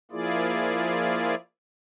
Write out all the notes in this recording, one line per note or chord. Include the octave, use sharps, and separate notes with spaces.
F3 A#3 E4 F4 G#4 D5